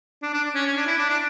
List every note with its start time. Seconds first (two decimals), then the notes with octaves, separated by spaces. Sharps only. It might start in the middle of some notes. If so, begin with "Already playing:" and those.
0.23 D4
0.33 D4
0.55 C#4
0.66 C#4
0.77 D4
0.87 E4
0.98 D4
1.10 D4